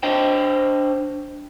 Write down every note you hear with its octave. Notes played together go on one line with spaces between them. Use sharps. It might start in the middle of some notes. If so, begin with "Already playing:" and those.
D4 C5 D#5 G5